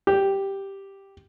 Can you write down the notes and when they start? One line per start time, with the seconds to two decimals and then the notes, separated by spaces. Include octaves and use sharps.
0.07 G4